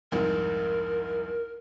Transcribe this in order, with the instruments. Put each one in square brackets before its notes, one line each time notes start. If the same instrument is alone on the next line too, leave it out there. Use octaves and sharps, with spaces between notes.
[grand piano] C2 F2 G#2 [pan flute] A#4